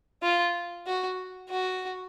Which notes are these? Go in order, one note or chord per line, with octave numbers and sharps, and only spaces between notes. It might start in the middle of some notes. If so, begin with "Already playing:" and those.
F4
F#4
F#4